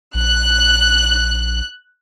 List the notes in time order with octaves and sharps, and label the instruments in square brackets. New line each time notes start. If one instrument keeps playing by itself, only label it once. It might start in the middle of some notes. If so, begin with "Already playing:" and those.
[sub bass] A#1 [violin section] F#6